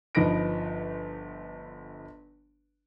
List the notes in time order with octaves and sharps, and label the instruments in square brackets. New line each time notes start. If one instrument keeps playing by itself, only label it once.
[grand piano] G1 F3 D#4 B4 A#6 D7